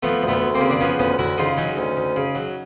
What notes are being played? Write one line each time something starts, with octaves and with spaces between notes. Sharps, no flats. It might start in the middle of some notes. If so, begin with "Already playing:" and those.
F3 A3 B3
D2
A3 B3
D2
A#3 C4
C#3
D4
F3 B3 C#4
D2 B3 C#4
D2 E4 F#4
C#3 D#4 F4
F#3 C#4 D#4
D2
D2
C#3
F#3